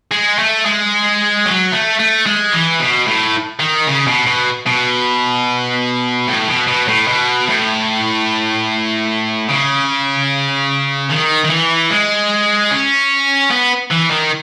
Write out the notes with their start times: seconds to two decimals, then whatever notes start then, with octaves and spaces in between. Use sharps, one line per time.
0.11 G#3
0.38 A3
0.65 G#3
1.45 F#3
1.72 A3
1.99 A3
2.26 G#3
2.53 E3
2.80 B2
3.07 A2
3.59 D#3
3.87 C#3
4.07 B2
4.27 B2
4.66 B2
6.28 A2
6.48 B2
6.67 B2
6.88 A2
7.07 B2
7.48 A2
9.49 C#3
11.10 D#3
11.45 D#3
11.50 E3
11.90 G#3
12.71 C#4
13.51 B3
13.91 E3
14.11 D#3